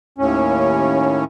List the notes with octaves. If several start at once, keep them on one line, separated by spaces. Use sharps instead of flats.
D#2 A2 C#4